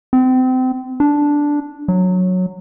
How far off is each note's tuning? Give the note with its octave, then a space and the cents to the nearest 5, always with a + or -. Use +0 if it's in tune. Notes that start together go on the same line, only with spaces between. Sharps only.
C4 -30
D4 -5
F#3 -10